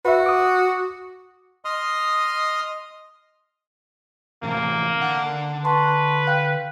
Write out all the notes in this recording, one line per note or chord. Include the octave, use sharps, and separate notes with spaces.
F#4 B4 E5
D6 D#6
D#5 C6 D#6 F6
A2 C3 E3 A#3
D3 F#5
B4 A5 C6 C#6
F5 G5 F#6